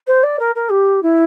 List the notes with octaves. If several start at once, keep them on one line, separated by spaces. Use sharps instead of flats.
C5
D5
A#4
A#4
G4
E4